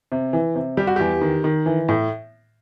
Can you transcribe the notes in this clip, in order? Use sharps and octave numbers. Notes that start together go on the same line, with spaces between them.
C3
E3
C3
G3 G4
F#4
E2 G4
D#3
D#3
E3
A2